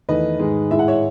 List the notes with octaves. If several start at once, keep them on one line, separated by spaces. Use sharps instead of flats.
E2 D#3 A3 B4 D#5
G#2 D#3 G#3
A2 G#3 E5
F#5
C#5 E5